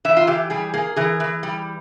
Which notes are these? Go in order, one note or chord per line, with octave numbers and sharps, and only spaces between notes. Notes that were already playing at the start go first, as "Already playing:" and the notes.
E3 E5
F4
E3 G4
G3 G#4
A#3 G#4
E3 G#4
E3
G3